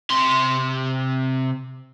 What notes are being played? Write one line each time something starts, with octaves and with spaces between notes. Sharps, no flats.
C3 C6